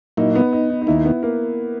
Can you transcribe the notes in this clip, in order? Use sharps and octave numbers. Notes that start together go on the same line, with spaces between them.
A#2 F#3 A#3 D#4 E4
B3
D#4
D#4
D#4
D#2 D#3 A#3 E4
B3
A#3